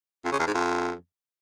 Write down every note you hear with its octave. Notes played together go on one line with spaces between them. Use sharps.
F2
C#3
E2
G#2
F2